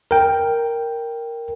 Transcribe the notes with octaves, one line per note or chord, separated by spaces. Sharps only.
A#4 G5